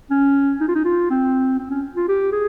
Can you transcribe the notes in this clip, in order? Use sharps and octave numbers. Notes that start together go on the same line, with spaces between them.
C#4
D#4
F4
D#4
F4
C4
C4
C#4
F4
G4
G#4